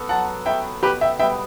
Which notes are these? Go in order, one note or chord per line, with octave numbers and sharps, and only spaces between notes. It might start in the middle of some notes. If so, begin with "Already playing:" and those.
Already playing: B3 F#4 A4
F#3 F#5 A5
B3 F#4 A4 E5 G5
B2 G4 B4
E5 G5
G3 B3 E5 G5